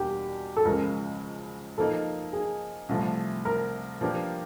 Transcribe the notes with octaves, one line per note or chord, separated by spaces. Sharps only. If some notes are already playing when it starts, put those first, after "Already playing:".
Already playing: E2 B2 G3 A#3 D4 G4
A4
C#2 C#3 F3 G#3 A#4
F3 A#3 D#4 A4
G#4
C2 C3 F3 A3
A#4
F3 A#3 D4 G4 B4